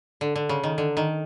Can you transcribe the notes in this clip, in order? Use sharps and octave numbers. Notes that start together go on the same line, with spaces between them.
D3
D3
C#3
D#3
D3
D#3